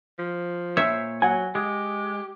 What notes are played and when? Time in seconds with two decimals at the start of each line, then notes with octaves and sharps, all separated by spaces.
0.19 F3
0.77 A#2 C5 C#5 E5
1.22 F#3 F#5 G#5
1.55 G#3 G4